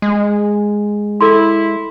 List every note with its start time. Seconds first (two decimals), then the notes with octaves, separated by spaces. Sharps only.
0.02 G#3
1.21 E4 A4 C6